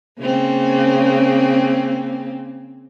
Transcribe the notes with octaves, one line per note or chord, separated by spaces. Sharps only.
C#3 A#3 C4